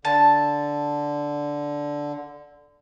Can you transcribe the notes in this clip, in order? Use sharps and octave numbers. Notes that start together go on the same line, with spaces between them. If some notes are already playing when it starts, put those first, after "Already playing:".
D3 A5